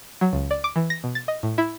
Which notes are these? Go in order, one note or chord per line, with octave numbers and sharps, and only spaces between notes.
F#3
C#2
D5
D6
E3
A#6
B2
A6
D#5
A2
E4